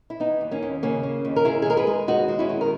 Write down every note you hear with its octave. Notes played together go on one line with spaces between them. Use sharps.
E4
E3 B3 D#4
D#2
A#3 C#4
D#2
C#3 A#3 C#4
C#3
D#2
A#4
D#2 E4 G#4
G#4
G#3 A#4
G#4 B4
G#3
D#2 D#4 F#4
G#3
C#4 E4
D#3
A#4